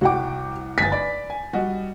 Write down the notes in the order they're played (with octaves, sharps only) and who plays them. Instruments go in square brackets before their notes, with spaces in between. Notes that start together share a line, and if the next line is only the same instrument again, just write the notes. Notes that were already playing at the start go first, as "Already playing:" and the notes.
[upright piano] C2 F#5 D6 [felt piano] F#4 G5
[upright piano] G1 G#5 [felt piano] A6 B6
[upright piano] D5 B5
G#5
G3 F#4 D#5